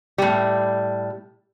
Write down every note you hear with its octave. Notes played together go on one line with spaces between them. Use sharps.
A2 G3